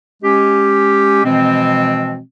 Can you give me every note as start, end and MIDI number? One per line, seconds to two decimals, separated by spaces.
0.23 1.24 56
0.23 1.24 61
0.23 1.24 67
1.24 2.19 47
1.24 2.19 52
1.24 2.19 53
1.24 2.19 56
1.24 2.19 60